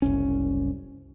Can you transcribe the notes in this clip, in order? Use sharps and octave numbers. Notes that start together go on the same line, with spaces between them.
F#1 C2 C#4